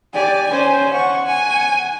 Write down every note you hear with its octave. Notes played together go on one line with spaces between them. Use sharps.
G4 D5 G#5
C#4 C5
F#5 C#6
G#5